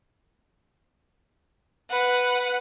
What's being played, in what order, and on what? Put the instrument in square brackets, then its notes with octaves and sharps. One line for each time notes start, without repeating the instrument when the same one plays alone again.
[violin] B4 F#5